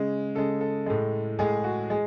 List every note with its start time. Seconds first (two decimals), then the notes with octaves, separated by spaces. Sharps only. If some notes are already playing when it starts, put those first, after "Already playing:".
Already playing: C#3 G#3
0.35 C#3 G#3 A4
0.61 A4
0.86 A2 G#3
1.38 A2 G#3 G#4
1.64 F#4
1.90 G#3 G#4